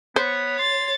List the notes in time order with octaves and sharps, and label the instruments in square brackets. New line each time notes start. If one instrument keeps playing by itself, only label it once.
[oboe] B3 [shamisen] C5 [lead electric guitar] C#5
[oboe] C6 [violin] A6